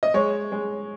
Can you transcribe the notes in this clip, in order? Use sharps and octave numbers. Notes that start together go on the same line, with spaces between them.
D#5
G#3 C#5
G#3